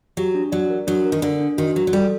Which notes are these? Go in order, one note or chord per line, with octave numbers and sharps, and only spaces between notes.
F#3 G4
D4
F#3 D5
A#4
F#3 D4
A#4
D#3
D3 D4
D4
D#3 F#4
F#3 F#4
F#3
G3 A4